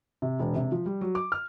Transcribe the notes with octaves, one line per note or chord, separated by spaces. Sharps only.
C3
E1
C3
F3
G3
F#3
D6
F6